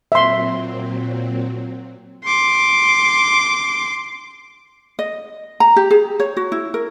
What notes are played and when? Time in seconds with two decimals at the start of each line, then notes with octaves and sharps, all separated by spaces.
0.12 A#2 F#3 C4 E5 C6
2.24 C6 D6
4.99 D#5
5.60 A#5
5.76 G4
5.91 G#4
6.20 C#5
6.37 F#4
6.52 E4
6.74 A#4